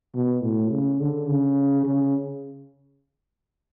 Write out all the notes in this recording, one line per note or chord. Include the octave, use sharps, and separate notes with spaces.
B2
A2
C#3
D3
C#3
C#3